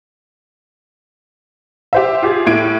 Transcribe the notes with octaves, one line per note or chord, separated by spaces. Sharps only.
G4 C5 E5
F4 G4 G#4
A2 G#6 D7